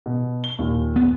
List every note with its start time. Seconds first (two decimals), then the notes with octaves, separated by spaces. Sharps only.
0.06 B2
0.44 G7
0.59 D#2 A#2
0.96 B3